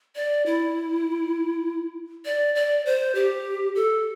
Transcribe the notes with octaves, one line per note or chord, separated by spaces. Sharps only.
D5
E4
D5
D5
C5
G4
A4